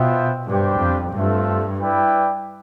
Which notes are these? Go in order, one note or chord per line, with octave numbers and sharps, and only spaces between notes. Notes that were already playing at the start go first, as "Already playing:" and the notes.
Already playing: B2 B3 F4 C5 E5 G5
G2 G3 D4 G4 C5 G5
F2
G2 A3 C4 F4 A4 E5
E4 B4 D5 G5